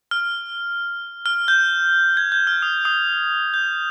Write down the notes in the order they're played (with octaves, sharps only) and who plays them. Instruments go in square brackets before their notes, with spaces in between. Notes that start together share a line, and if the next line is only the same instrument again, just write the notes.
[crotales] F6
F6
G6
G#6
G6
F6
D#6
D#6
G6